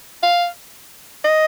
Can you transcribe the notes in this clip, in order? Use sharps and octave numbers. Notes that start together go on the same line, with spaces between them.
F5
D#5